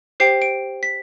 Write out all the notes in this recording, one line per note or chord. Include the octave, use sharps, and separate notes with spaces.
G4 C5 G5 C7
D7
B6